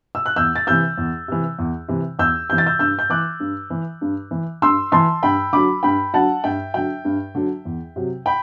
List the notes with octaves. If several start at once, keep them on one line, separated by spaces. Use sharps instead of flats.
E6
F#6
E2 E6 G6
A6
C3 E3 E6 G6
E2
C3 E3
E2
C3 E3
E2 E6 G6
C3 E3 G6
A6
E6 G6
G2 E6 G6
G6
E3 D6 F#6
G2
E3
G2
E3
G2 C6 E6
E3 A5 C6
G2 G5 B5
D3 F#3 B5 D6
G2 G5 B5
D3 F#3 F#5 A5
G2 E5 G5
D3 F#3 E5 G5
G2
D3 F#3
E2
C3 F#3
G5 B5